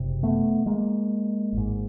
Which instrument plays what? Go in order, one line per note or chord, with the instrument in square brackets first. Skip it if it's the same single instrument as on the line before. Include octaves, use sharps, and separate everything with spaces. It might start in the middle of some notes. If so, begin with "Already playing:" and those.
Already playing: [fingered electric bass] F#1 C3
A3 B3
G#3 A#3
G#1 G#2